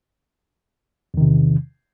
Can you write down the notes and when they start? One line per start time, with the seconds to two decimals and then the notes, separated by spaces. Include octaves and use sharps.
1.14 E2
1.17 D#3
1.21 C3